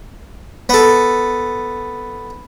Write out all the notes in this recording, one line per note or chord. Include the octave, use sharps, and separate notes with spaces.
B3 A4